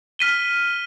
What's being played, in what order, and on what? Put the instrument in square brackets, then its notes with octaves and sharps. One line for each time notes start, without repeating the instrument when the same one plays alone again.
[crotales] F6 B6 D#7 G7